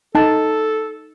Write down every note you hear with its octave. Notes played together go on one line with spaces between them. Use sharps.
D#4 A4 A5